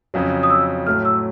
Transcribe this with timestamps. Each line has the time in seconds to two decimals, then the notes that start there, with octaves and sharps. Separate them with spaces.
0.14 F2 C#3 F#3
0.43 D#6
0.50 E6
0.86 A2 F#3 A3 F6
1.05 E6